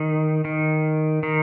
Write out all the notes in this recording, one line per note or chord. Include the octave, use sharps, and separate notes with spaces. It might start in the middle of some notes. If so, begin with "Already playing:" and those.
Already playing: D#3
D#3
D#3